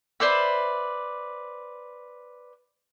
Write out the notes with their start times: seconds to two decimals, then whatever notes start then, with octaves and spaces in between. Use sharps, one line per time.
0.20 B4 C5 D5 E5